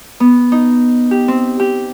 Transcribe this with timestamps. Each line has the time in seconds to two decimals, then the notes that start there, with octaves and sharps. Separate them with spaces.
0.20 B3
0.52 D#4
1.11 G4
1.28 C4
1.60 G4